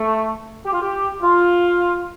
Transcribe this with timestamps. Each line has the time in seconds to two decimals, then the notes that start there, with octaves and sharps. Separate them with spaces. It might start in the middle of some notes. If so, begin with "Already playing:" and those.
Already playing: A3
0.65 G4
0.73 F4
0.81 G4
1.21 F4